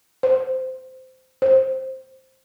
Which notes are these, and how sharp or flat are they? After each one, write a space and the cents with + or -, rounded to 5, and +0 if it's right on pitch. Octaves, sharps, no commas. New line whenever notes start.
C5 -15
C5 +10